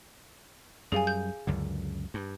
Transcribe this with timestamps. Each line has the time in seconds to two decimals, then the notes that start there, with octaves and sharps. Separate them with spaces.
0.92 F#2 G3 G#4 F5 G#5
1.07 G6
1.47 C#2 F#2 D3
2.14 G2